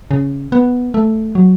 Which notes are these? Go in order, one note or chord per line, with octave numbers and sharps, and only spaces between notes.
C#3
B3
A3
F#3